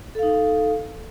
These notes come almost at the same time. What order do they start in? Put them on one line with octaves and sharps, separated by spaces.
A4 F5 D#4